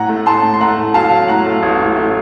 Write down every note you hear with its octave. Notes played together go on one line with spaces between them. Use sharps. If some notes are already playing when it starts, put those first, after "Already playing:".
Already playing: A2 F#5 A#5
A3
A2 A5 C6
A2
C6
A3 F#5 A#5
A2
F#3 F5 A5
F#3
A2 F#5 A#5
A3
A1
A2
A3